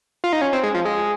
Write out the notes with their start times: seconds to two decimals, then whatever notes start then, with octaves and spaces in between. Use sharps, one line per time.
0.24 F4
0.33 D#4
0.42 C#4
0.53 C4
0.63 G#3
0.74 F3
0.85 G#3